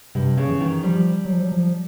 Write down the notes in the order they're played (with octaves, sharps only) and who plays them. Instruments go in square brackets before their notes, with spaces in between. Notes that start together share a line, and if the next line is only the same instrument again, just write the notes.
[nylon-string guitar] G2 [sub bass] C3
[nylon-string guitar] C#3
[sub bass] E3
[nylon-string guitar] D#3
[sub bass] F3 [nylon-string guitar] G3
[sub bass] F#3
F3
F#3
F3